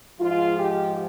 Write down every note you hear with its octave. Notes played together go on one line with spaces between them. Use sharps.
G#2 F3 G#3 F4
G4